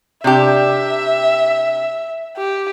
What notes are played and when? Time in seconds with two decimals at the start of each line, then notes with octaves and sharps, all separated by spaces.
0.24 C3 D4 G4 E5
2.37 G4